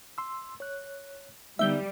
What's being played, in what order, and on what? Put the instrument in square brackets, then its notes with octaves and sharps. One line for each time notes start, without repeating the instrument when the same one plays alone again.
[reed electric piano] C6 E6
C#5 F#6
[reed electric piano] D3 B3 D#4 [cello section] G3 [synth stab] E5 G6